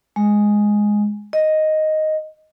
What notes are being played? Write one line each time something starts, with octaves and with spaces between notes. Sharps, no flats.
G#3
D#5